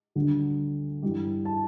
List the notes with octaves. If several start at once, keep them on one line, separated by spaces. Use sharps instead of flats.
D2 D3 G3 D4
G2 E3 G3
A5